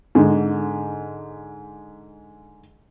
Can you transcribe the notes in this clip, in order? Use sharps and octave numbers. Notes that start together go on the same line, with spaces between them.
G#2 D3